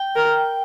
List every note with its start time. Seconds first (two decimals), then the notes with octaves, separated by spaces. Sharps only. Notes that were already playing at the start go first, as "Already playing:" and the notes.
Already playing: G5
0.16 A#4